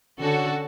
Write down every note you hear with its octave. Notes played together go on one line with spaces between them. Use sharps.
D3 C#4 F#4 A4